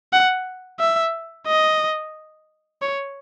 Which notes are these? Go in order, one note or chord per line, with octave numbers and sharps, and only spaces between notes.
F#5
E5
D#5
C#5